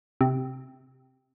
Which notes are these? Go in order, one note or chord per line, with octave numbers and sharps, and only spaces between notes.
C3